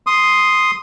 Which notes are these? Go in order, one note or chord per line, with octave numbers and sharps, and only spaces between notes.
C6 D#6